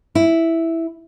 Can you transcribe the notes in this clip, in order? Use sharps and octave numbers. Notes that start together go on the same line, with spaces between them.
E4